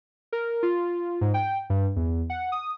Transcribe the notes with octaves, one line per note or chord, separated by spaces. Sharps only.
A#4
F4
G#2
G5
G2
E2
F#5
D#6